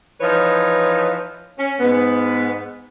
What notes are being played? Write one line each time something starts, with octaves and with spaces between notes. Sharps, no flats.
E3 F3 D#4 B4 C#5
C#4
G#2 B3